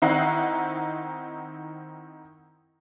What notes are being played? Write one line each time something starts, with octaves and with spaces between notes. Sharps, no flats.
D#3 C4 D#4 E4 F#5 C7